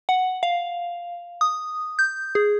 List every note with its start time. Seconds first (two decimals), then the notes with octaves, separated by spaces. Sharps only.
0.09 F#5
0.43 F5
1.41 D#6
1.99 G6
2.35 G#4